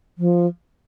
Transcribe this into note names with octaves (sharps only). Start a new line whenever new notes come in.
F3